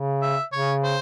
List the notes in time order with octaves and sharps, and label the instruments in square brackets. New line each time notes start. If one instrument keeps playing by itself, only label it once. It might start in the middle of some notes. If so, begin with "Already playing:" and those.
Already playing: [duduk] C#3
[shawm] E5
[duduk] C#3 [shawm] C#5
[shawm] C5